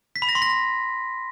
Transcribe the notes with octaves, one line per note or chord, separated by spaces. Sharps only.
B6
B5
A#6
C6
A#6